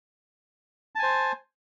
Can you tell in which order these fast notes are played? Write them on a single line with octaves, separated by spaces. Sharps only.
A5 G#5 C5